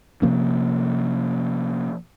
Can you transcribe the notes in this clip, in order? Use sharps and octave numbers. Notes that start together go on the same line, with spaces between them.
C3 F3 A#3 C#4